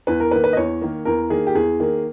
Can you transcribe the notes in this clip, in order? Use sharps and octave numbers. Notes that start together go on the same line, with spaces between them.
E2 B4
A#4
D#3 A#3 B4
B4
D#5
E2 C#5
D#3 A#3
E2 A#4
D#3 A#3 G#4
G4
E2 G#4
D#3 A#3